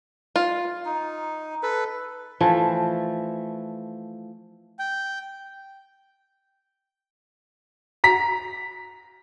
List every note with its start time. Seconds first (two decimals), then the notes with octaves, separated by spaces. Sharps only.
0.36 F4
0.85 D#4
1.63 A4 B4
2.41 E3 F3 A3
4.79 G5
8.04 A#5 B6